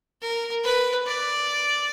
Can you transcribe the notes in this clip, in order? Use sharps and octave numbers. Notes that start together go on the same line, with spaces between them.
A#4
B4
D5